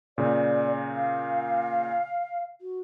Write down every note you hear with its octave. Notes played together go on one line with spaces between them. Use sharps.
A#2 C#3 D5
F5
F#4